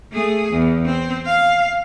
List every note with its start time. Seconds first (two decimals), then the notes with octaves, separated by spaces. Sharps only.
0.12 A3 G#4
0.52 E2
0.85 C4
1.26 F5